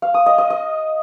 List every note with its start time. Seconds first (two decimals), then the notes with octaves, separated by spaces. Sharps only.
0.02 F5
0.14 D#6
0.26 D#5
0.38 D#5
0.50 D#5